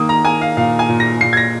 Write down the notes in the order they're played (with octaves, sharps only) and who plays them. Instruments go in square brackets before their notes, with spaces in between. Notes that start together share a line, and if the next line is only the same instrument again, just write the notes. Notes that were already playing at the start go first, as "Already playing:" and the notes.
Already playing: [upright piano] D#3 A#3 D#6
A#5
A#3 G#5
F5
A#2 F5
G#5
A#2
A#6
A#2 C7
G#6
A#6